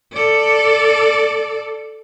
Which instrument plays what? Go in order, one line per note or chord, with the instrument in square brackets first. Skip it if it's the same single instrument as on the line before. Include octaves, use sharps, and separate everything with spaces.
[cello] A4 D5